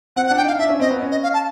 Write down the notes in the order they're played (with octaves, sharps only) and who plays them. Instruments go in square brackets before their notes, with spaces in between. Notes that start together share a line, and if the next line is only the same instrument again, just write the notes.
[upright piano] C4 [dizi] F#5
[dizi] F#5
[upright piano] D4
[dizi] G5
[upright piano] D#4 [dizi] F5
[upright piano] D4 [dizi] E5
[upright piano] C#4
[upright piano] C4 [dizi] D#5
[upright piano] B3
C#4
[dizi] D#5
F5
A5